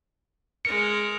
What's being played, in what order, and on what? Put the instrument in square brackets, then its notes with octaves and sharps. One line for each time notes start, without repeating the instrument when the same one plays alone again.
[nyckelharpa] G#3 A#4 [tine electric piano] C#7